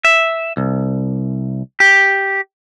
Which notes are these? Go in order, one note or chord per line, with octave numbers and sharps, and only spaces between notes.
E5
C2
G4